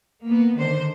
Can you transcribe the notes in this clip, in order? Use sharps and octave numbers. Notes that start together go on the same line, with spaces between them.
A#3 B3
D3 D#3 C5